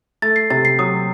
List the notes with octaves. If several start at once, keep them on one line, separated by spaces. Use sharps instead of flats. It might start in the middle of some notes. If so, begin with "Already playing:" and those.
A3 A6
C7
C3 A6
C7
F#3 D#6